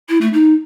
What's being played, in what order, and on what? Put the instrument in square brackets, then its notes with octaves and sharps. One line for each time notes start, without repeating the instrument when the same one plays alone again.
[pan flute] E4
A3
D#4